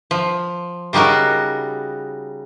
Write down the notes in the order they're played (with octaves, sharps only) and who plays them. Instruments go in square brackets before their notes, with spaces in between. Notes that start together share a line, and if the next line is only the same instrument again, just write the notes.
[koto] F3
C#3 G3 D#4 F#4 A#4